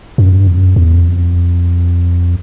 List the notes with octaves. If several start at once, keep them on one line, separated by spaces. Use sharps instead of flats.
F#2
G2
F2
F#2
E2
F2